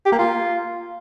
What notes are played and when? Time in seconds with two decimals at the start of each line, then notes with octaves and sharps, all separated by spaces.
0.06 G4
0.12 A#3
0.19 F4